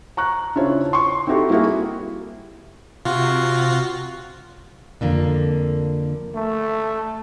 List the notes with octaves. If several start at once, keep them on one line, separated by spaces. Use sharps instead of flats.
A#5 C#6 F#6
C#3 D4 E4 F4 C5 C#5
C6 C#6
C4 D#4 E4 F#4 G4 A4
G3 A#3 E4 F#4 G#4
C3 F4 F#4
F2 D3 A#3
A3